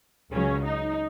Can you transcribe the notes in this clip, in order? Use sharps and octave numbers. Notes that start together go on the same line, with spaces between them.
C#2 C#3 F#3 C#4
D#4